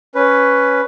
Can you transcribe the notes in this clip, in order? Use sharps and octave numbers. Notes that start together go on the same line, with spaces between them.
C#4 B4